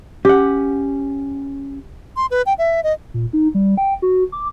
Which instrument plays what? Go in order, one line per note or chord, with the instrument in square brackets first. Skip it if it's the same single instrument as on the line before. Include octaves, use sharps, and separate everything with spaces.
[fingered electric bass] C#4 [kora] G4 F#5
[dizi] C6
B4
G5
E5
D#5
[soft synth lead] A#2
D#4
G3
G5
F#4
D6